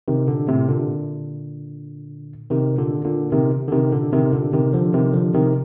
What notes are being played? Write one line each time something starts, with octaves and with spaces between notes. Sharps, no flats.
C3 D#3
A#2 D3
A2 C3
A#2 D3
C3 D#3
A#2 D3
A#2 D3
C3 D#3
D3
C3 D#3
A#2 D3
C3 D#3
A#2 D3
C3 D#3
D3 F3
C3 D#3
D3 F3
C3 D#3